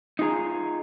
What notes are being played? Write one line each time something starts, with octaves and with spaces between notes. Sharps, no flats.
D#4 F4 G#4 A#5